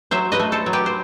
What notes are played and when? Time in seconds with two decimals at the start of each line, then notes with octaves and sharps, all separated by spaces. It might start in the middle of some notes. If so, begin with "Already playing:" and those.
0.11 F#3 C5 E5
0.32 B4 D#5
0.39 A3
0.52 A4 C5
0.66 F#3
0.73 G4 B4
0.86 C5